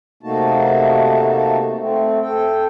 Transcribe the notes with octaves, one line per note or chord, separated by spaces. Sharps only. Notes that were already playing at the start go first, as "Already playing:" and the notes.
C3 A3 A#3 D#4 F#4 A5
A3 C4
A4 G5